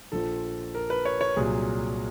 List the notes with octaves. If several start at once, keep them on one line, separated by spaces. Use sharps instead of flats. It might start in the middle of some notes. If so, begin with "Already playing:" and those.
A#1 A#2 F3 A4
A#4
B4
C#5
C#5
C2 A#2 F#3 G#4